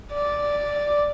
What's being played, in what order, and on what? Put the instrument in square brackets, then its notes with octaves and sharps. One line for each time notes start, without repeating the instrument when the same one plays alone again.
[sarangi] D5